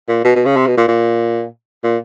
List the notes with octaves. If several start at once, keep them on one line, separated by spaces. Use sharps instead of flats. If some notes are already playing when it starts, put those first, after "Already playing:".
A#2
B2
B2
C#3
C3
B2
A#2
A#2
A#2